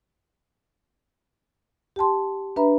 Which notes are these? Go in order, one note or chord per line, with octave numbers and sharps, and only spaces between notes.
G4 G5 A5 C6
D4 B4 E5 A#5 B5